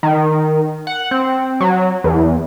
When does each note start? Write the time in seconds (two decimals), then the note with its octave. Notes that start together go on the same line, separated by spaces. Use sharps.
0.03 D#3
0.87 F#5
1.11 C4
1.61 F#3
2.04 E2